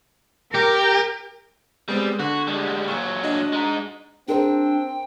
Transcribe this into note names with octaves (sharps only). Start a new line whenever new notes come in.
G4 A#4
G3 G#3 B3 C4
D3 F#4
G3 G#3
A#2 F#3 C#6
D4 F#4 D#5
G#3 D#4
C4 D4 G#4 A#4 C5 G5